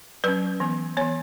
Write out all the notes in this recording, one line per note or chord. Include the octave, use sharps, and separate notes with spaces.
F#3 C#4 B4
E3 B3
E3 B3 C#5